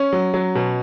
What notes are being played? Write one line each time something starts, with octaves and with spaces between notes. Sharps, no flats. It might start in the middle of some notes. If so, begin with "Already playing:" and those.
Already playing: C#4
F#3
F#3
B2